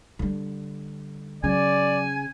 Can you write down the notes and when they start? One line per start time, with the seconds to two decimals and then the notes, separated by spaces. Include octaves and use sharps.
0.19 D3 G3
1.44 C#3 F#3 D5 G#5